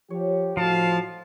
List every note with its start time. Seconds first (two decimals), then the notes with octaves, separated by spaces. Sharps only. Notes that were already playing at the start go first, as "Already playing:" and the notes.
0.10 F3 G4 C#5
0.57 A2 F3 D#4 F#4 C5 F5 A5